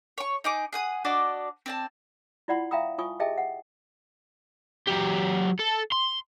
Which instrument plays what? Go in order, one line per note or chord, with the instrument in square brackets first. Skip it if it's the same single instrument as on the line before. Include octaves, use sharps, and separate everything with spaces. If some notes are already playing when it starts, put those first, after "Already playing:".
[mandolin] C#5 C#6
D#4 G#4 D6
G#4 F#5 D#6
D4 F#4 D5 D#5
C4 D5 A5
[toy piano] E4 F4 D5 F#5 B5 C6
E5 F5 G5 A#5 B5 D#6
F4 G#5 C#6 D#6
G4 G#4 D#5 E5 G5 A5
F#5
[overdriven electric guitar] F#3 G4
A4
C6